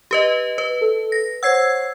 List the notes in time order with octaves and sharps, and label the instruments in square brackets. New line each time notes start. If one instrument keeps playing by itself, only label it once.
[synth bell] G4 B4 D#5
B4
[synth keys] A4
[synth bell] A#6
[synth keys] C5 C#5 F#5 [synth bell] E6 G#6 C7